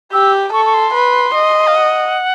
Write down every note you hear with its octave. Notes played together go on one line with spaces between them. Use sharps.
G4 E6
A4 C#6
C#6
C6
B4
D#5
F5
F#5